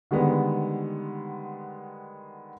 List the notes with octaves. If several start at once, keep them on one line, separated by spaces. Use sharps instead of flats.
D3 D#3 G3 G#3 B3